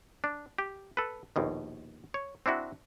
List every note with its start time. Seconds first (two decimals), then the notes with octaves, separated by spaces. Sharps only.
0.24 D4
0.58 G4
0.97 A4 B4
1.36 A#1 D#2 B2
2.14 C#5
2.46 C4 D4 E4 F#4